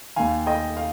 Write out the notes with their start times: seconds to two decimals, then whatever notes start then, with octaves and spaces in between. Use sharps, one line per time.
0.16 D#2 D#3 F5 G#5
0.46 D#5 G5
0.77 F5